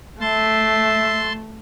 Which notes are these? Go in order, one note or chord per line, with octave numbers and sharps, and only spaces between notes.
A3 E5 A5 C6